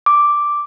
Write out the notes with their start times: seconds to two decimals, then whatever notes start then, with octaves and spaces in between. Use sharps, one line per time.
0.06 D6